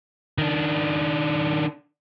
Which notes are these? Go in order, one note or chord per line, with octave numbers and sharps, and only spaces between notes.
D#3 D4